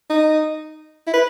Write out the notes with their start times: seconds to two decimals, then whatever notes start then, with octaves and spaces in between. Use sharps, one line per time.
0.10 D#4
1.07 E4
1.14 B4